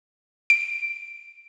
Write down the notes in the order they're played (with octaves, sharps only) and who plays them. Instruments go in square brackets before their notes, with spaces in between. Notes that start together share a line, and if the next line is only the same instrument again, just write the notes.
[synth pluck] D7